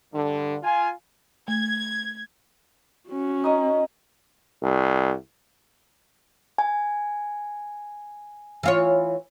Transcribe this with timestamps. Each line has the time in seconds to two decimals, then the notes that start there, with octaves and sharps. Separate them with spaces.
0.13 G2 D3
0.63 F4 G#5
1.48 A3 G#6
3.09 C#4 F#4
3.44 D#4 D#5
4.63 C2
6.58 G#5
8.63 E3 F4 C#5